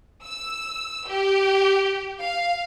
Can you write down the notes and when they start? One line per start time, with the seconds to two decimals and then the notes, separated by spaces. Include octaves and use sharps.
0.24 E6
1.09 G4
2.19 F5